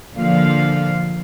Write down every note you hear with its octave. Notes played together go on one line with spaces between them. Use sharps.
A#2 D3 F3 F5